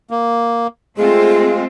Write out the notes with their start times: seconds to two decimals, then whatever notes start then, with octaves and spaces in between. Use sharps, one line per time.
0.11 A#3
0.98 G#3 A3 C4 F4 G#4